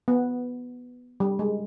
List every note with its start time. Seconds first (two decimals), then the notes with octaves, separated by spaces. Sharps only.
0.08 B3
1.20 G3
1.39 G#3